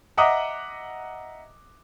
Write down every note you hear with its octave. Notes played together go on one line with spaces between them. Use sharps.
D#5 E5 F#5 A#5 D6 D#6